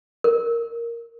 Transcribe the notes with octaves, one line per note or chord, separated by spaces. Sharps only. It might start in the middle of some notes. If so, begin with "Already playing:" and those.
A#4